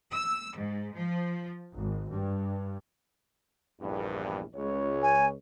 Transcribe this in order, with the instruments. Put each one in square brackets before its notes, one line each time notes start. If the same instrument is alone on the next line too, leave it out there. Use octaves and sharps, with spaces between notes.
[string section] E6
G#2
F3
G#1
G2
[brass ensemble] A#1 E2 G2
C#2 C#5
[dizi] G#5